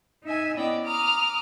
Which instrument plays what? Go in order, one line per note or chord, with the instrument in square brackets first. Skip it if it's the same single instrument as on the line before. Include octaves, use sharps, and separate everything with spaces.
[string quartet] D#4 E5 G#5
B3 C#4 E4 D5 D#5 G5
A#5 D6 D#6 F6